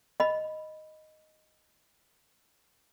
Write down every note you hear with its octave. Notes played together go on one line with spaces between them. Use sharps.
D#5 B5